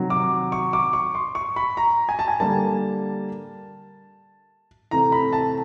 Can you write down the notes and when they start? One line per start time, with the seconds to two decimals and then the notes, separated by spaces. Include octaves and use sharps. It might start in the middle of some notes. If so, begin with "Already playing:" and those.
Already playing: C3 D#3 F#3
0.10 D6
0.52 C#6
0.73 D6
0.93 C#6
1.15 C6
1.35 C#6
1.56 B5
1.77 A#5
2.09 G#5
2.19 A5
2.28 G#5
2.40 D3 G3 A#3 A5
4.91 C3 E3 A3 C4 A#5
5.12 B5
5.33 A5